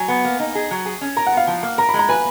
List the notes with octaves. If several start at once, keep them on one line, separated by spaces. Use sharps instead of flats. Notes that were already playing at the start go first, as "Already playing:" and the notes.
Already playing: F#3 G#5
B3
A#3
D#4
G#4
F#3
G#4
C#4
A#4 A#5
F#5
B3
F5
F3
A#3
A#4 A#5
B5
G#3
A#5
B4 G#5